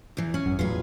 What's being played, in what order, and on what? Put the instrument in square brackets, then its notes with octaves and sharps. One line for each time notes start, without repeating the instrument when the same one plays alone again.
[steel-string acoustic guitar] E2 E3
C#4
[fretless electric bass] G#1 F#2
[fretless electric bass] E2 A2 F#3 [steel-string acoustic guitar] F4 G#4 B4